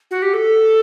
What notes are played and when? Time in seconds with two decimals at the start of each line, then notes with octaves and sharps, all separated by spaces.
0.11 F#4
0.22 G4
0.34 A4